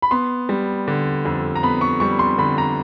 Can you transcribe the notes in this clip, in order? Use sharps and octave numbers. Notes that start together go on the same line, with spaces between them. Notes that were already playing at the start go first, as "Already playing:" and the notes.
B5
B3 C6
G3
D3
F2
A#5
B3 B5
C#6
G3 C#6
C6
D3 B5
A#5